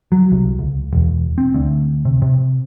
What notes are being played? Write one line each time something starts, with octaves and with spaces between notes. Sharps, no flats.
F#3
C2
C#2
E1
C4
D2
C3
C3